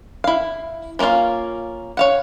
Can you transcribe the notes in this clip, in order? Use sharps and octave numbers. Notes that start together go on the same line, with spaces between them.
E4 F5
F3 A#3 C#4 F4 F5
C#5 F5 F#5